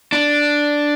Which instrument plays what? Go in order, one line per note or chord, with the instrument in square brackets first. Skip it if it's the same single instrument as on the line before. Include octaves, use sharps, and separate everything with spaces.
[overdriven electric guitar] D4